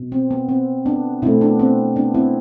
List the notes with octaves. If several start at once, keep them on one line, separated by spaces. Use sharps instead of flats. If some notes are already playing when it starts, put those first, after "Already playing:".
Already playing: B2
C4
B3
C4
B3 D4
B2 A3 C4 E4
B3 D4
C4
B3 D4
C4 E4